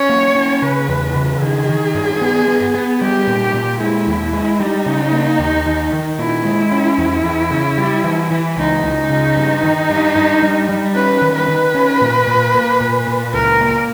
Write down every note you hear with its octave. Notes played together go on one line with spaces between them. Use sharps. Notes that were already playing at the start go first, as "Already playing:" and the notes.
Already playing: C#4 C#5
A#3
C#4
C#3 B4
E2
C#3
D#3 G#4
D#3
G2
B3
B3
B3
G3 G4
A#2
A#2
G#3 E4
D#2
G#3
G3 D#4
C#3
A#3
D#2
D#3
D#3
A#2 E4
G#3
C#4
E2
E2
C#3
G3
E3
E3
C#2 D#4
C#2
C#3
G2
D#3
G2
G2
G3
G3
C#4 B4
D#3
B4
D#3
C#4
A#2
A#2
A#3
A#2
A#2
C#2 A#4
A#3